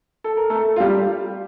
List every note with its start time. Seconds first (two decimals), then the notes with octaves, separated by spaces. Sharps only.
0.24 A4
0.37 A#4
0.50 A3 A4
0.76 F4
0.80 G3 G4